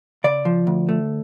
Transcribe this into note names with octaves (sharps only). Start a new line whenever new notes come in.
C#3 D5
F3
D2
A3